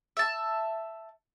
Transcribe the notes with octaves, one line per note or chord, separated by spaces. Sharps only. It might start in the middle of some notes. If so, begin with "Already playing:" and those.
E5 A5